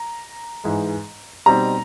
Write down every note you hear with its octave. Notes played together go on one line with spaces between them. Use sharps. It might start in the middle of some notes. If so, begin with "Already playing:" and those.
Already playing: A#5
G#2 E3 G#3
B2 G3 C4 D#4 A#5